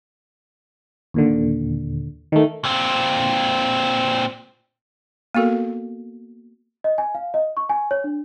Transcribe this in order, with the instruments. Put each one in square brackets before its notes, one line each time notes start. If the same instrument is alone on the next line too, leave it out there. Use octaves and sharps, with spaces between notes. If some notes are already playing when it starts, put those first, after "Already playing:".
[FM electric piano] D#2 A#2 D3
D#3 A3
[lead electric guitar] A#2 C4
[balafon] A#3 B3 F#4 A4 A#4
[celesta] D#5
G#5
F5
D#5
C#6
G#5
C#5
D4